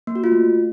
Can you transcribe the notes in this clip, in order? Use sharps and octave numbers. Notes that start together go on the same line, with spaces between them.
A#3
F#4
F4
A3